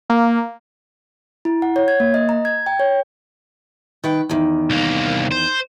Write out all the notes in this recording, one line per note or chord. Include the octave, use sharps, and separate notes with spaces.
A#3
E4
F#5
C#5
G#6
A#3
D#5
A#5
G#6
G5
C#5
D#3 B4 G5
E2 D#3
C2 A#3
C5